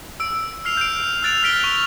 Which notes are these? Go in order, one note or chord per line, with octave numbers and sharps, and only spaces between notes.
E6 D7
F6 C7 F7
G6 D7
E6 F#6 A6 D7 F7
F6 B6 D7 G7
C#6